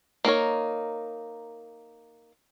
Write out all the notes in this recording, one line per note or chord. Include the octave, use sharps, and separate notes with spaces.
A#3 D#4 A#4 C#5